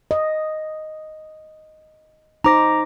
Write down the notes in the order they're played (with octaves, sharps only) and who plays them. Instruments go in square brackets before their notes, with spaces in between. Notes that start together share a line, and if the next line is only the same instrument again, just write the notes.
[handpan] D#5
[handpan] D#4 C5 [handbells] A#5 D6 A#6